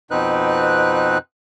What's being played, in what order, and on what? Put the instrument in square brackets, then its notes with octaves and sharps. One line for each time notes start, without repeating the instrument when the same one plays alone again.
[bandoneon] F2 B2 C4 D#4 B4 F#6